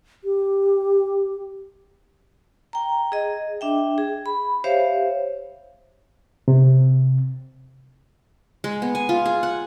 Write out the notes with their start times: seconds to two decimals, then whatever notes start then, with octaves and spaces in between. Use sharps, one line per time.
0.24 G4
2.73 G5 A#5
3.12 G#4 D#5
3.61 D4 E5 G5
3.98 G#4
4.26 B5
4.64 G4 C5 C#5 E5 F5
6.48 C3
8.64 G#3
8.82 B3
8.95 G#5
9.09 F4
9.26 G#4
9.43 F#5